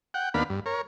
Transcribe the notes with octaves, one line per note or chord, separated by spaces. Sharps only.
F#5 G5
D#2 A#3 B3 D4 F5 B5
G2
A#4 C#5